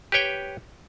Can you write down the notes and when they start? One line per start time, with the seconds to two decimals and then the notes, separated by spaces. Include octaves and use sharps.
0.12 G4 B4 C#5 G5